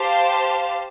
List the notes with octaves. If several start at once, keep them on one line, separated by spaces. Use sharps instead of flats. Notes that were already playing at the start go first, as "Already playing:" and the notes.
Already playing: G4 C5 F5 A5